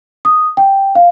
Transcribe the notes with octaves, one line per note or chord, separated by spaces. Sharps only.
D#6
G5
F5